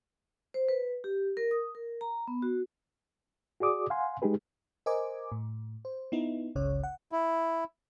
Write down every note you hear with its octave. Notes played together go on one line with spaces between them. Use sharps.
C5
B4
G4
A#4
D#6
A#4
A#5
B3
F#4
F#4 G#4 D5 D6 D#6
F5 F#5 G#5 C6
G#3 D#4 G4 G#4 B4
A#4 C5 D#5 G#5 D6
A2
C5
B3 D#4 E4
G1 C#2 C#3 C#5
F#5
E4